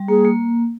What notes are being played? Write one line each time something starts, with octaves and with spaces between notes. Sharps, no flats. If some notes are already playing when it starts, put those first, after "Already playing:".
Already playing: G3
A#3 G#4
A#3